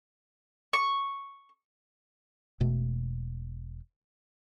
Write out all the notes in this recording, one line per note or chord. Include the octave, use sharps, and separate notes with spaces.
C#6
E1 B2 A3